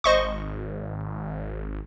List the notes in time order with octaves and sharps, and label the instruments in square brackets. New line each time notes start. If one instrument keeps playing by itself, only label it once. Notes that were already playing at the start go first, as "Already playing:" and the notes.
[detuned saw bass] G#1 [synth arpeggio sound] C5 D#5 C#6